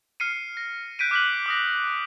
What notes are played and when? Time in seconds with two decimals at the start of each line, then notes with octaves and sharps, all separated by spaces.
0.20 F6 C7 C#7 D#7
0.57 A#6
0.99 F#6 G6 B6 D7 D#7
1.11 D6 F6 F#6 B6 D#7 F#7
1.46 D6 D#6 A#6